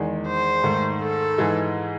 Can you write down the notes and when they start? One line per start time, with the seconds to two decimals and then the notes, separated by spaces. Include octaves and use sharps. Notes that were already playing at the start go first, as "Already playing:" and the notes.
Already playing: E2 D#3 G#3
0.27 C5
0.64 G#2 D#3 A3
1.01 A4
1.38 G#2 E3 G#3